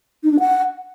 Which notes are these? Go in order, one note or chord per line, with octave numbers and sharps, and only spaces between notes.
D#4
D4
F#5